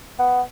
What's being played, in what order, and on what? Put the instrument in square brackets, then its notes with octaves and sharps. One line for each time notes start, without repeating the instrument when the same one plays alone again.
[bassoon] B3